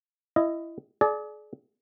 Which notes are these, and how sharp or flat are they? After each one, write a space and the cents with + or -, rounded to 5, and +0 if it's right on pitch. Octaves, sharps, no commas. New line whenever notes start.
E4 +20 D#5 +0
G#4 +40 D5 +0